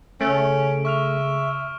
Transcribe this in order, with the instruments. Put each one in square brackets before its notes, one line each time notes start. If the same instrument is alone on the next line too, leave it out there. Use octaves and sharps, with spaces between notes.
[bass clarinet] C#3 [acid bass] A3 [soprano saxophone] C#4 [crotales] D7
[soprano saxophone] E5 [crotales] C#6 F6 F7